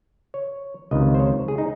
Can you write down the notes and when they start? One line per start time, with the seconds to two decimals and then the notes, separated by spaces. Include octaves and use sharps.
0.34 C#5
0.91 C#2 C3 D#3 D#5
1.15 C5
1.20 C#5
1.48 G#4
1.58 D#4